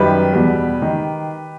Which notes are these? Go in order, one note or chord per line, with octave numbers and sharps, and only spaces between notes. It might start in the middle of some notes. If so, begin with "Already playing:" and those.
Already playing: F#2 D#3 G3 G4 B4
E2 B2 G3
D#3